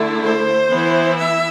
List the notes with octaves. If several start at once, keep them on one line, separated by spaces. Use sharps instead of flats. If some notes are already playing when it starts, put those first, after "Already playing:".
Already playing: D3 A3 E4
C5
E3 B3 E4
E5